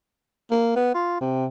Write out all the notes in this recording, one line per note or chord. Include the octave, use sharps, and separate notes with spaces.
A#3
B3
F4
C3